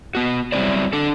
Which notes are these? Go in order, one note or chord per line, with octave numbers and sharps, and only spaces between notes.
B3 F#4
F#3 G3 C4 E4 C5 D5
D4 A4